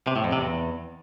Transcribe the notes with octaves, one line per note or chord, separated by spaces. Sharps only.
C3
A2
F2
C3
E2